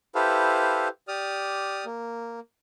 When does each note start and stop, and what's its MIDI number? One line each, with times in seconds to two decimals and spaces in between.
0.15 0.88 64
0.15 0.88 67
0.15 0.88 69
0.15 0.88 71
0.15 0.88 72
0.15 0.88 77
1.08 1.85 67
1.08 1.85 74
1.08 1.85 87
1.08 1.85 89
1.86 2.40 58